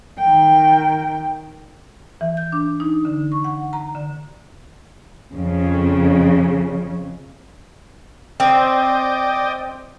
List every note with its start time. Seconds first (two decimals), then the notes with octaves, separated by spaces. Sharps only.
0.19 D#3 G5
2.21 E3
2.37 G6
2.52 D4
2.80 D#4
3.05 D3
3.32 C#6
3.44 F#5
3.73 A#5
3.95 D3
5.34 F2 C#3
8.40 C4 D5 D#5 G5